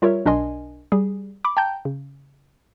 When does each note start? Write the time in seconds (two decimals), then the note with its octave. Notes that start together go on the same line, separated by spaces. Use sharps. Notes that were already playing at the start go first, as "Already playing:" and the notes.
0.02 G3 F4 A#4 C#5 E5
0.26 B1 D4 A#4 D#5 G#5 C6
0.92 G3 G#4
1.45 B5 D6
1.57 G5 A5 A#5 G6
1.85 C#3